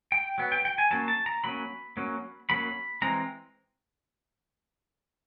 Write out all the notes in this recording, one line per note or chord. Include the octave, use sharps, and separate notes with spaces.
G5
F#3 B3
G5
G5
G#5
F#3 A#3 C#4 A5
A5
A#5
F#3 A#3 C#4 B5
F#3 A#3 C#4
F#3 A#3 C#4 B5
E3 G#3 C4 A#5